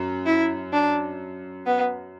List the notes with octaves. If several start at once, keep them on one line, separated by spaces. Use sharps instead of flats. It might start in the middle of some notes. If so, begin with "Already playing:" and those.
Already playing: F#2
E4
D4
B3